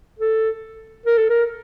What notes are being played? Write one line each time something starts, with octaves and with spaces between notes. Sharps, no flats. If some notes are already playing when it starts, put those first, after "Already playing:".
A4
A#4
A4
A#4